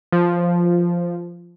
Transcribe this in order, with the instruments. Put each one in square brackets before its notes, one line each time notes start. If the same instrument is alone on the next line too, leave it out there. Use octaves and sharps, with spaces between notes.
[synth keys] F3